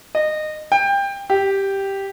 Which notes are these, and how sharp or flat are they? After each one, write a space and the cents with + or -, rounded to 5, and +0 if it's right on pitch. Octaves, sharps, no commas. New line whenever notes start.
D#5 -20
G5 +20
G4 +0